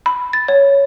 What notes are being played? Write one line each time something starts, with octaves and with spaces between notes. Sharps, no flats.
B5
A6
C#5